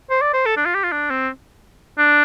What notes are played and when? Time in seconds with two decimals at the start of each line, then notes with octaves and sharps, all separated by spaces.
0.10 C5
0.22 D5
0.34 C5
0.46 A4
0.57 D4
0.66 F4
0.75 G4
0.84 F4
0.92 D4
1.10 C4
1.99 D4